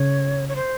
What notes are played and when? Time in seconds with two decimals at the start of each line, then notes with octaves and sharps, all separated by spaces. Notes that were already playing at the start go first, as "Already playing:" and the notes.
Already playing: C#3 C#5
0.49 C#5
0.56 C5